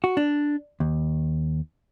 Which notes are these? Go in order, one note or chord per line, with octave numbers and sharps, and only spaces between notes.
F#4
D4
D#2